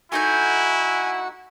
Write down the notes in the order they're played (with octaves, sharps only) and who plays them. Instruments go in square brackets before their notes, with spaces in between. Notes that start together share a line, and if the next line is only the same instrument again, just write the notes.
[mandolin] A3 D#4 G6 [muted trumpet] E4 [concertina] F#4 F#5 [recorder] G#5